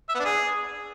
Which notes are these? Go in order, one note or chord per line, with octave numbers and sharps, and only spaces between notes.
E5
B3
D4
G#4